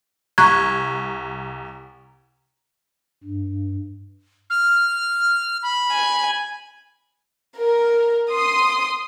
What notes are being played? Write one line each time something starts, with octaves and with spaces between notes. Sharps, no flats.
C2 A#5 C#6 F#6 G#6
G2
F6
B5
G#5
A#4
C6 D#6